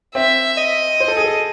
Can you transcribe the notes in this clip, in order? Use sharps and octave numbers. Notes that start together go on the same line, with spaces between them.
C4 E5
D#5
C5
A4
G#4
A4